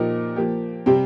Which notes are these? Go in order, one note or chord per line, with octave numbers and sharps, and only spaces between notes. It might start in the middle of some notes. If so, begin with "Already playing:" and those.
Already playing: A#2 F3 D#4 G4 A#4
F3 A#3 G4
C3 G3 C4 G4